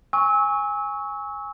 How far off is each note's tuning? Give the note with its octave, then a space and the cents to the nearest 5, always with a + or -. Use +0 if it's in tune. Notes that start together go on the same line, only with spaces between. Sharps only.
G#5 -10 C#6 +0 E6 -30